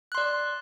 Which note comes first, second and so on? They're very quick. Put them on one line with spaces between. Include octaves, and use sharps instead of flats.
F#6 C6 D5